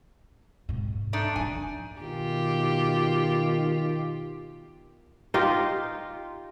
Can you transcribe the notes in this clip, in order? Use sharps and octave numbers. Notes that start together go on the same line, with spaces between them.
G#2 C3
A3 D4 D#4
F2 D3 G#5
B2 D#3 F4 G4
D#4 F4 G4